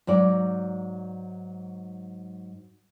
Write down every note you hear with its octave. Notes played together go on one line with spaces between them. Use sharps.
G#2 F#3 D5